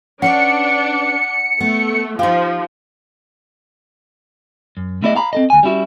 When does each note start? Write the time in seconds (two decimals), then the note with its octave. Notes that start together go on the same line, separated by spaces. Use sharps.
0.22 C#4 D4 B4 D5 F#5 C#7
1.60 A3 B3
2.19 F3 D#4 G4 F5
4.77 F#2
5.02 A3 B3 E4 G#4 D5 D#5
5.16 F5 A#5 B5
5.33 C4 A4 D#5
5.50 D2 G#5
5.63 G3 C#4 E4 F#4